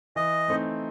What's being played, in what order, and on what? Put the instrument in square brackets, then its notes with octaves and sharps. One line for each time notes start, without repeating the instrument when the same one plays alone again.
[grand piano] E3 [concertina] D#5
[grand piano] A3 C4 D#4